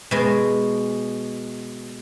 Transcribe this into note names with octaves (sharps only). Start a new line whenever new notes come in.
B2 G#3